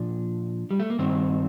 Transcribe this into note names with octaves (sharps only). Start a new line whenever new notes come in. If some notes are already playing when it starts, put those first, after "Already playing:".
Already playing: A#2 F3 D4
G3
A3
A#3
G2 D#3 C4